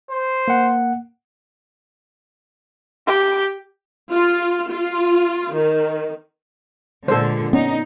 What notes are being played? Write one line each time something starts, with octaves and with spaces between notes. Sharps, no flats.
C5
A#3 F#5
G4
F4
F4
D#3
A#2 D3 G#3 A4 C5
B3 C#4 D#4